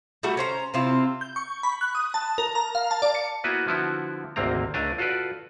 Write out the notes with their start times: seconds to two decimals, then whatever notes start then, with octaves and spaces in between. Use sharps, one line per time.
0.23 G3 A3 F#4 A4
0.37 C#4 C5 A#5
0.74 C3 C4 E4 F4
1.21 G6
1.36 C#6
1.63 B5
1.81 F#6
1.95 D#6
2.14 A5
2.38 A#4
2.55 A#5
2.75 F5
2.91 A5
3.02 D5
3.15 C#7
3.44 A#3 B3 E4 F#4 B4 G#5
3.67 D3 F3 B3 E4 F#4
4.36 G#1 D2 C3 A#3 C4 A#5
4.74 C#2 A3 D4 G#5 A#5
4.98 F4 F#4 A4 B4 D5